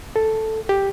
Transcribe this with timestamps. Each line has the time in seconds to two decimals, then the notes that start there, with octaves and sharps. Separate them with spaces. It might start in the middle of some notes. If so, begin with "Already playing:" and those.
0.16 A4
0.69 G4